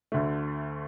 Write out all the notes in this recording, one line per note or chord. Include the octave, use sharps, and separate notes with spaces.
D2 D3 A3